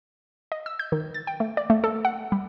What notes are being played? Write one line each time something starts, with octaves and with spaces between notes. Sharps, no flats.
D#5
E6
G6
D#3
A6
G5
A3
D5
A3
A4
F#5
G3